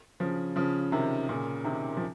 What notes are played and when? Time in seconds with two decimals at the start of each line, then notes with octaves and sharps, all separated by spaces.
0.20 C#3 F3
0.56 C#3 F3
0.92 C3 D#3
1.29 A#2 C#3
1.64 C3 D#3
1.97 F3